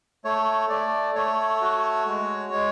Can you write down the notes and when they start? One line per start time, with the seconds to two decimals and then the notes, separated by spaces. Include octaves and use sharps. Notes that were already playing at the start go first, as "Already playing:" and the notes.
0.24 A3 C#5
0.69 A3 D5
1.15 A3 C#5
1.61 F#4
2.07 G#3
2.53 G#3